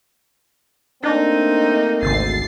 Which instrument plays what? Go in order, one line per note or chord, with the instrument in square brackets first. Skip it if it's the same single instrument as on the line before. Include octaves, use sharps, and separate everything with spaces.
[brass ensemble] A3 A#3 C4 [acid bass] D4 [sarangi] D#4
[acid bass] G#1 [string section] D2 A6 C7